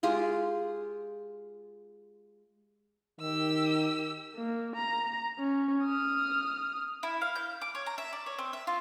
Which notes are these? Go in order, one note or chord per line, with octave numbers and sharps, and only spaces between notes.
G#3 F4 G4 G#4
D#3 G4 E6
A#3
A#5
C#4
D#6 F6
E4
F5
G6
D6
C#5
A#5
E5
D5
C#5
C4
E5
F4